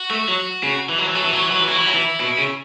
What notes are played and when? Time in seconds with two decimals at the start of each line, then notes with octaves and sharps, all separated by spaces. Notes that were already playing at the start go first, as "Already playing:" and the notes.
Already playing: F#4
0.10 A3
0.28 F#3
0.63 C#3
0.89 E3
0.98 F#3
1.07 E3
1.15 F#3 A4
1.24 E3
1.33 F#3 C#5
1.43 E3
1.51 F#3 B4
1.60 E3
1.68 F#3 E4
1.77 E3
1.86 F#3
1.94 E3
2.21 B2
2.39 C#3